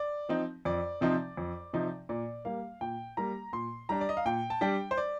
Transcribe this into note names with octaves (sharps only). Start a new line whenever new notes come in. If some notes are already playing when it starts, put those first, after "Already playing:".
Already playing: D5
F3 C4 D#4
F2 D5
C3 F3 C4 D#4
F2
C3 F3 C4 D#4
A#2 D5
G3 A#3 F5
A#2 G5
G3 A#3 A#5
A#2 C6
G3 D4 A#5
D5
D#5
F5
A#2 G5
A5
G3 D4 G5
C5
D5